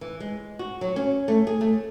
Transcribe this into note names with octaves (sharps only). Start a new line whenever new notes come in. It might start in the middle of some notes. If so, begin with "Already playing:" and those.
E3
G#3
F#4
F#3
C#4
A3
G#4
A3